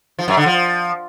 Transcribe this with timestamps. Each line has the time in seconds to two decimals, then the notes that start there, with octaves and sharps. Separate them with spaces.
0.19 F3
0.28 F#2
0.37 D3
0.46 F3